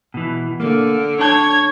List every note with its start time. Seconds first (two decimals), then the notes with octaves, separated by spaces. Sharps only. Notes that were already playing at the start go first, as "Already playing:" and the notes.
0.14 B2 E3
0.60 D3 A#3
1.19 D4 C#5 A5 G#6